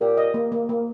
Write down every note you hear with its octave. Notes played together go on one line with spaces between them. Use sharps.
A#2 G4
D#5
A#3
A#3
A#3